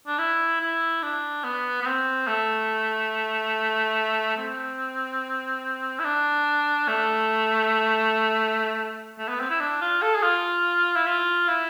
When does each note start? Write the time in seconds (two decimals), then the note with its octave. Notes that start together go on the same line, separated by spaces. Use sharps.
0.07 D4
0.19 E4
0.61 E4
1.03 D4
1.44 B3
1.82 B3
1.86 C4
2.28 A3
4.37 C4
5.99 E4
6.04 D4
6.88 A3
9.19 A3
9.29 B3
9.40 C4
9.50 E4
9.60 D4
9.81 F4
10.02 A4
10.16 G#4
10.23 F4
10.96 E4
11.07 F4
11.49 E4